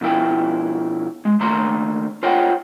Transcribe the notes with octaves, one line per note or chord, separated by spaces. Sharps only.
B2 F3 E4 G5
G#3
D#3 A3 A#3 A#5 C6
F4 C5 C#5 D#5 F#5 G5